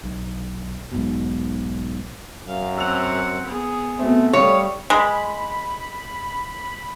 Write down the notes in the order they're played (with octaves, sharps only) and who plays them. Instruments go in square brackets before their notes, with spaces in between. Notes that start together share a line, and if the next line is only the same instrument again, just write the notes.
[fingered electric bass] B1
B1 G#2 B2
[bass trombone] F#2 [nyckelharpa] F5
[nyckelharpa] C4 F#5 [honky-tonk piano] E6 F7
[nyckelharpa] B3 G#4
[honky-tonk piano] B2 C4 [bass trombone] A3
[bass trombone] G3 [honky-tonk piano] A3 [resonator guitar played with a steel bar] C#5 [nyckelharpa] F5 D#6
[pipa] G#3 [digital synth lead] B5